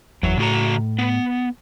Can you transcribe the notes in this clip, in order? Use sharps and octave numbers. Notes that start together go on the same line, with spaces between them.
F#1 E2 F#3
A2 C#3 F#4 A#5
B3